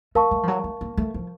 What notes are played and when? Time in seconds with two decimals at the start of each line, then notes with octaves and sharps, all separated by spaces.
0.15 A3 A#4 F5 A5 C#6
0.31 A3
0.43 F3
0.48 F#3
0.64 A3
0.81 A#3
0.97 A3
1.14 F3